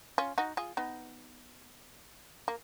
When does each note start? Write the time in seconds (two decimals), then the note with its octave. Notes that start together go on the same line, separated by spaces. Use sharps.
0.18 C#4 F4
0.38 D#4 F#4
0.57 F4 G#4
0.77 B3 D#4
2.48 A#3